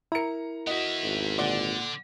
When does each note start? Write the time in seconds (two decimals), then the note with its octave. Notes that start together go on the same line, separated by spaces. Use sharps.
0.12 E4 A#4 A#5 C#7
0.67 B3 F#4 D#5 E5
1.03 G#1
1.38 A#2 D3 D5 F#5